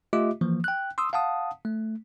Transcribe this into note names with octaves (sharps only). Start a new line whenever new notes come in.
A3 F4 G4 D#5 E5 D6
E3 F3 A#3
G5 F#6
C6 D#6 E6
F5 F#5 A5 D#6
A3